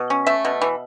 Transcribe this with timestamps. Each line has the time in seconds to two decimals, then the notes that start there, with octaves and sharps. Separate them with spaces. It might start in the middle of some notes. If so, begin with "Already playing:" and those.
Already playing: B2
0.10 C#4
0.27 A3 E5
0.45 B2
0.61 E3